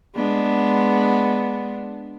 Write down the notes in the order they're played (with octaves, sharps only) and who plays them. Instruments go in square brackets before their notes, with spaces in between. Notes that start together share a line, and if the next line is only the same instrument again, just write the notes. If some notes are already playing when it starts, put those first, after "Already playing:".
[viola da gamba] G#3 B3 D4